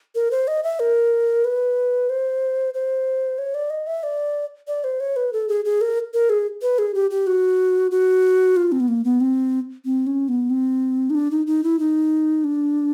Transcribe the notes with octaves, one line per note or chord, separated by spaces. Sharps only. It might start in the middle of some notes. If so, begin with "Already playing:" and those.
A#4
C5
D#5
E5
A#4
B4
C5
C5
C#5
D5
D#5
E5
D5
D5
C5
C#5
B4
A4
G#4
G#4
A#4
A#4
G#4
B4
G#4
G4
G4
F#4
F#4
F4
C4
B3
A#3
B3
C4
C4
C#4
B3
C4
D#4
D4
D#4
D#4
E4
D#4
D4